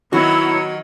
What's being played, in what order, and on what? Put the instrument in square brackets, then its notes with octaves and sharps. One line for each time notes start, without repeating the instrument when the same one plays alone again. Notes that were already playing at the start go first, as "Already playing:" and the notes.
[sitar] D#3 F#3 [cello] B3 C#5 [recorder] E4 [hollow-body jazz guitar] F#4